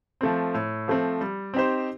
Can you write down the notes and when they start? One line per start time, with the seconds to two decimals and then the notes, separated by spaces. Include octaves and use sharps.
0.21 F3 A3 C4
0.54 A2
0.88 F3 A3 C4
1.21 G3
1.54 C4 D#4 G4 C5